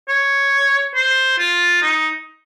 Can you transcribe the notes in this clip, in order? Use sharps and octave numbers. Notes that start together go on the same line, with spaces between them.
C#5
C5
F4
D#4